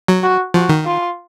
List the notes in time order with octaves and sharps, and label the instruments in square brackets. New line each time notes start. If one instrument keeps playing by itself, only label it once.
[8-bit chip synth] F#3
[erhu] F#4
[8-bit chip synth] F3 [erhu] F#4
[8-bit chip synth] D#3
[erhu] F4